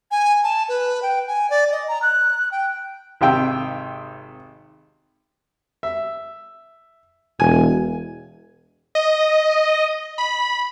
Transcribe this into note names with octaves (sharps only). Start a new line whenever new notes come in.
G#5
A5
B4
G5
G#5
D5
D#5
A#5
F#6
G5
G#1 C3 F5 G5 E6
E5
E1 G#5
D#5
B5